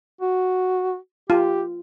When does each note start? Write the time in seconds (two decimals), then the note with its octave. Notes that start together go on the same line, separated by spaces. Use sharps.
0.21 F#4
1.30 F4 G4